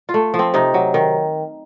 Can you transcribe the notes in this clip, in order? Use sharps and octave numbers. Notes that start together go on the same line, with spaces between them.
F4
A3
F3
C4
C3 D#4
F#3
D#3